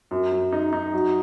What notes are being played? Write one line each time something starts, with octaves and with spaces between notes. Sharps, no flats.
F#2
F#2
D#4
D#4
F#3